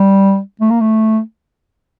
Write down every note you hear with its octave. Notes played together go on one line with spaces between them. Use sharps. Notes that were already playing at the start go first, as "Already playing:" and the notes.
Already playing: G3
A3
A#3
A3